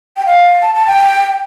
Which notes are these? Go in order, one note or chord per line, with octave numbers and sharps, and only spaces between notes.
G5
F5
A5
A5
G5